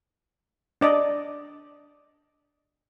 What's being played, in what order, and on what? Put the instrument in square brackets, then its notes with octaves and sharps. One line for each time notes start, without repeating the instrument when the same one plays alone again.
[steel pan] D4 D5 D#5